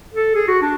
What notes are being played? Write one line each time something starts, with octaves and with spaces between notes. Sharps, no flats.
A4
G#4
F#4
D4